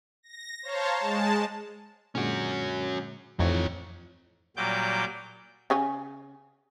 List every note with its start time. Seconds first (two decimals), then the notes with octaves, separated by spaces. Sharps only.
0.23 A#6
0.63 C5 C#5 F5 A5 A#5
0.97 G#3 A5
2.15 A#2 D3 G#3 C#4 F#4
3.39 F2 A2 E3 D#4 C#5
4.57 A#2 F#3 G3 D6 G6
5.70 C#3 C#4 G#5